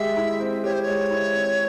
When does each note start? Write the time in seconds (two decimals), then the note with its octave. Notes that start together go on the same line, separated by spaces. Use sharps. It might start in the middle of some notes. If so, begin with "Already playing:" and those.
Already playing: G#3 G4 E5
0.17 E4
0.40 C4
0.64 G4 C#5
0.73 C5
0.83 G#3 C#5
1.11 E4
1.34 C4